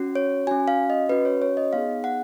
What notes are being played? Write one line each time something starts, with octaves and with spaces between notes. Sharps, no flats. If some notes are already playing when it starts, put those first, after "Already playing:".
Already playing: C#4 F#4
C#5
C#4 F#4 G#5
F5
D#5
C#4 F#4 B4
C#5
C#5
D#5
B3 D#4 G#4 F5
F#5